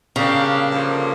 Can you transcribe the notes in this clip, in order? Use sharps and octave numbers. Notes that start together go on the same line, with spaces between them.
C#3 G3 A#3 D4 G4
G2 D3 F3 A#3